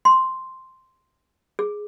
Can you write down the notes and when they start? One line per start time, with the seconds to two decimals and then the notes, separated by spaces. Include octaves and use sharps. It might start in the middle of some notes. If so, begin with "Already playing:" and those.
0.05 C6
1.59 G#4